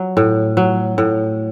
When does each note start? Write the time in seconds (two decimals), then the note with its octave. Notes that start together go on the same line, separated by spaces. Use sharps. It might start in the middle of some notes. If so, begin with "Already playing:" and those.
Already playing: F#3
0.17 A2
0.57 F#3
0.98 A2